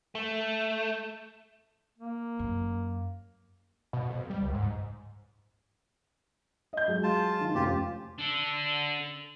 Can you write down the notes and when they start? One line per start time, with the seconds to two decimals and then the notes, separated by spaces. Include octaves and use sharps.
0.15 A3
1.99 A#3
2.39 F#2
3.93 B2
4.09 F2
4.30 G3
4.42 C#2
4.54 G#2
6.73 D#5 G6
6.88 F#3 G#3
7.04 F4 A5
7.41 D#3 F3
7.55 F1 C#4 F4 G4
8.19 D4 A4